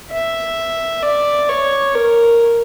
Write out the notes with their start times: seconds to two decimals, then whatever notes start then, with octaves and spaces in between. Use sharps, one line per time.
0.11 E5
1.03 D5
1.49 C#5
1.95 A#4